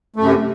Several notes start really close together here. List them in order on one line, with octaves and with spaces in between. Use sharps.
A3 F#2 C3